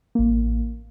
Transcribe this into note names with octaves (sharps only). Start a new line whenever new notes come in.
A1 A#3